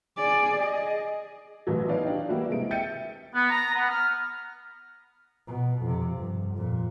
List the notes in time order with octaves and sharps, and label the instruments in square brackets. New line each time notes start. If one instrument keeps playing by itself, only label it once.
[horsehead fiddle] G#4 D5
G#4 D#5
[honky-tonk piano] A1 E3 F#3
B3 D#4 B4 C#5 D5 F5
D4 G4
E3 G3 A#3 E4 F#4
C3 G#3 D7
E5 G5 G6 A6 C#7 D#7
[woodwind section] B3
A#5
B3
F6
[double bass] B2
F2 C3
G2
F2 A#2